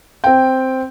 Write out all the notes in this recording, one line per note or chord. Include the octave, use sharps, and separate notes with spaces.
C4 G5